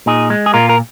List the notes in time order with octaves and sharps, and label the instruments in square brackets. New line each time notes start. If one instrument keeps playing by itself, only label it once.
[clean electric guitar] A#2 D#4 G#4
G#3
G#4
A#2 F4 A#4
A#4